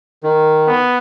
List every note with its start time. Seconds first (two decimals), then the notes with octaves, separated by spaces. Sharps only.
0.23 D#3
0.67 B3